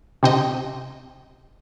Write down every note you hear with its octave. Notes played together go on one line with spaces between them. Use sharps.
C3 C4 D#5